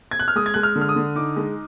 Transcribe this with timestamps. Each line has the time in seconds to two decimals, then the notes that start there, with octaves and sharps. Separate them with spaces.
0.11 G#6
0.19 F#6
0.28 F6
0.35 G#3 D#6
0.46 G#6
0.54 G#3 F#6
0.63 F6
0.76 D3
0.81 F6
0.89 D#6
0.96 D3
1.15 D#4 D6
1.36 G#3